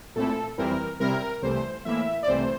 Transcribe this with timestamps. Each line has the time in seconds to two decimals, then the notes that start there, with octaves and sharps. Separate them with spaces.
0.15 A#2 A3 C4 E4 A4
0.58 F2 E3 G3 C4 E4 A#4
1.00 C3 G3 C4 E4 A#4
1.42 C2 C3 E3 A3 C5
1.85 A2 E3 A#3 E4 E5
2.23 D5
2.27 C2 C3 E3 A3 C4 C5